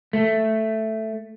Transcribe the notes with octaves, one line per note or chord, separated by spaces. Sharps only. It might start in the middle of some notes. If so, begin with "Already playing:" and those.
A3